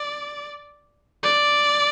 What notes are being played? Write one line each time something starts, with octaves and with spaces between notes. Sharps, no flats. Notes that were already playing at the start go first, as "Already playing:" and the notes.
Already playing: D5
D5